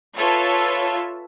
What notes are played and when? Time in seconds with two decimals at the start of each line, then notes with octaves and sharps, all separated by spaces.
0.17 F4 A4 B4 C#5 E5